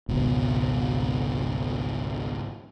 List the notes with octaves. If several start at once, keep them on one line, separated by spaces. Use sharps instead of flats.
G#1 C#2 B2